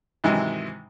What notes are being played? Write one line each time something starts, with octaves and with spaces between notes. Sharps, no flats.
G#2 C3 D#3 E3 F#3 G#3